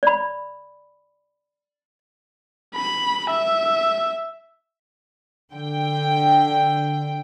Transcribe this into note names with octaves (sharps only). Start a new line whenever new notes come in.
D5 B5
B5
E5
D3 G5